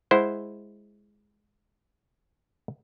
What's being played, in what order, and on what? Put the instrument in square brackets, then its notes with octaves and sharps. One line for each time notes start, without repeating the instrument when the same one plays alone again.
[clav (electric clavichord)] G#3 E4 C5 F#5